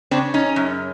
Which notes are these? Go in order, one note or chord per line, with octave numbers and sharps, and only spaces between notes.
C#3 C4 D4
C#4 D#4
F#2